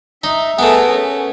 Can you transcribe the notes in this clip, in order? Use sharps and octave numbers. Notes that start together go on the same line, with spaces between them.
D#4 E5
A3 B3 G#4 A#4
C#4